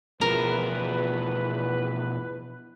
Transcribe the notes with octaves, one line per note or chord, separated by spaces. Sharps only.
E2 B2 F3 A#4 B4